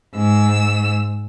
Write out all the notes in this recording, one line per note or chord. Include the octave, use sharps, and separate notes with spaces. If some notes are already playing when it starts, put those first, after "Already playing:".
G#2 E6